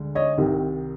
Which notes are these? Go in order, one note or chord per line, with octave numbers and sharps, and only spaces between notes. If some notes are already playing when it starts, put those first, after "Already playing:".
Already playing: D2 D3 G#3
C#5 D#5
C2 C3 D#3